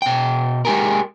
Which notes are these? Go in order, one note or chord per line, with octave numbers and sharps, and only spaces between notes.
B2 G5
G#3 G4 G#4 A#4